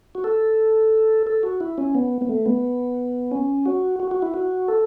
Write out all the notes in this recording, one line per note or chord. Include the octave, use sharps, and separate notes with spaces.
F#4
A4
A4
F#4
E4
C#4
B3
B3
A3
B3
C#4
F#4
F#4
F#4
E4
F#4
A4